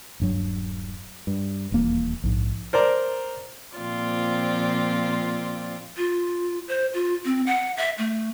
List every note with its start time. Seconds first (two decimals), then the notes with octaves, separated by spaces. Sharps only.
0.20 D#1 G2 F#3
1.27 G2
1.72 D#1 E2 A#3
2.23 A#1 G#2
2.73 A#4 C5 D5 A#5
3.77 A#2 F3 C4 F4 D5
5.97 F4
6.68 C5
6.94 F4
7.25 C4
7.47 F#5
7.77 E5
7.98 A3